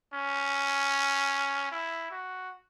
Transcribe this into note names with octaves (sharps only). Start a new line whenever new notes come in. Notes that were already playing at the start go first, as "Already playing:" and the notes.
C#4
E4
F#4